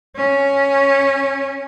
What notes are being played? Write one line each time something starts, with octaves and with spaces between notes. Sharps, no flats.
C#4